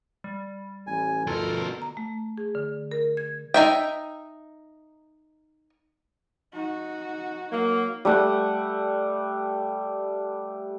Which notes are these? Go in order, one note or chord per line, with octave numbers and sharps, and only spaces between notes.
G3
A1 G#5
D2 B2 F4 A4 A#4
A#5
A3
G#4
D3
A#4
G#6
D#4 E5 G5
D#4 F#4
F#3 A#3
G3 A3 F#5